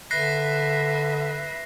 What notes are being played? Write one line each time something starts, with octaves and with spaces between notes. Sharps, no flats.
D3 B4 E5 F#6 A#6 C7